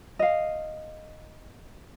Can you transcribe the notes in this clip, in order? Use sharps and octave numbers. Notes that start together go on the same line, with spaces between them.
D#5 F5